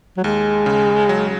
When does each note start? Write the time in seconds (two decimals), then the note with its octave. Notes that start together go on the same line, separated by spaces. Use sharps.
0.17 F#3
0.24 D#2 G#3
0.66 C#3
1.09 F#3